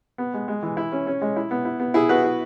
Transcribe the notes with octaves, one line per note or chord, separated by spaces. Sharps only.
B3
G#3
G#3
E3
E4
C#4
C#4
G#3
E4
B3
E4
B3
E4 G#4
B3 F#4 B4
E4